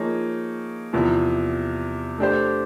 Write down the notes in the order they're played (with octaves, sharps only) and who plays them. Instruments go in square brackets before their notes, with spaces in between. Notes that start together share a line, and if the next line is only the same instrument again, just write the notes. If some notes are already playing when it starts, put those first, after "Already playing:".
Already playing: [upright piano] F3 A#3 D#4 G#4 C#5
E2 C3 F3
A3 D4 G4 C5